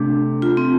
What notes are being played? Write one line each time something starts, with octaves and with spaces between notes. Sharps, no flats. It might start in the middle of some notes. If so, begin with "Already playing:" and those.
Already playing: C3 A3 D4
F4
C4